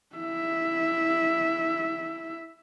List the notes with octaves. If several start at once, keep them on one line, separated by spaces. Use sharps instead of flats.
E4 E5